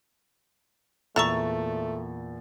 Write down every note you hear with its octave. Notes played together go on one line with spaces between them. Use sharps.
E2 A#2 A3 A4 E5 A#5 C#6 A6